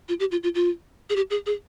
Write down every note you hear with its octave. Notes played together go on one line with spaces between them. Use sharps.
F4
G4
F4
F4
F4
G#4
G4
G#4
G#4